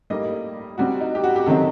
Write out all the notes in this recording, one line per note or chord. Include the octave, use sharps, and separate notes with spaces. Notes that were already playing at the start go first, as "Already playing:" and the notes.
A2 G3 A#3 D#4 D#5
C3 G3 C4 F#4
D#4
G4
F#4
G4
C3 D#3 F#3 C4 D#4 A4